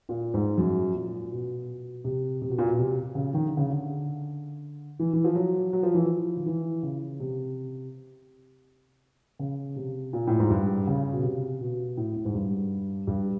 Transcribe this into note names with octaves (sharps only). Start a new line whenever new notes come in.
A#2
G#2
F#2
A#2
B2
C3
C3
B2
A#2
B2
C3
C#3
D#3
D3
C#3
D3
E3
E3
F3
F#3
F#3
F3
E3
F3
D#3
E3
C#3
C3
C#3
C3
A#2
A2
G#2
G2
C#3
B2
C3
B2
A2
A2
G#2
G2
G2